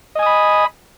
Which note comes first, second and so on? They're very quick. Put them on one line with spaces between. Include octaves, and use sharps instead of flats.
D#5 G#5 D#6 B5